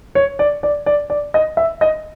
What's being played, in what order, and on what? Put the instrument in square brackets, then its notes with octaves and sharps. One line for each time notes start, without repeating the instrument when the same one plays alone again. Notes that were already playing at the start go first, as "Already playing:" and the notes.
[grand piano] C#5
D5
D5
D5
D5
D#5
E5
D#5